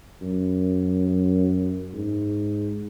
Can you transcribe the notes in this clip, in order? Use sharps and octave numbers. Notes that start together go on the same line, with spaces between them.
F#2
G#2